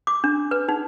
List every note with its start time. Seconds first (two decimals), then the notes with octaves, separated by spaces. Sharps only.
0.07 D6
0.24 D4
0.51 B4
0.69 D#4